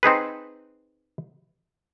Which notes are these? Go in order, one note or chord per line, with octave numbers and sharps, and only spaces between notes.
C4 D#4 G#4 B4